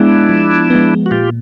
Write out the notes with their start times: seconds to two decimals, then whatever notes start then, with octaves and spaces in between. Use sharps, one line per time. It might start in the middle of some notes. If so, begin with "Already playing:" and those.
Already playing: G#3 B3 D4 E4
0.29 F3
0.70 G#3 B3
1.06 F#4
1.11 A#2 F4 G4